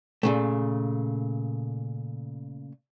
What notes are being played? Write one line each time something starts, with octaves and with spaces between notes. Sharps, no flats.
A#2 C#3 A3